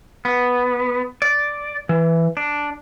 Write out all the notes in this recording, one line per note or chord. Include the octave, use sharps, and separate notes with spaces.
B3
D5
E3
D4